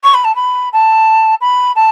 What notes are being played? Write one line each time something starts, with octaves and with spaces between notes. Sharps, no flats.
C#6
B5
A5
B5
A5
B5
A5